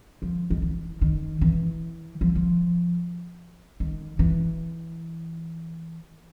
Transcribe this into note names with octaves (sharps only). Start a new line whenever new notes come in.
F3
D#3
E3
D#3
E3
F3
F3
D#3
E3